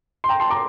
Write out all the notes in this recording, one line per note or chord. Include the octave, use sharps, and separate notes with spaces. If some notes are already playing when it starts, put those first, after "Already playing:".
C6
G5 A#5
A5 C6
A#5 D6